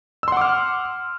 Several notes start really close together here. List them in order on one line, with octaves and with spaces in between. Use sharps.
E6 C6 F#5 D6 F6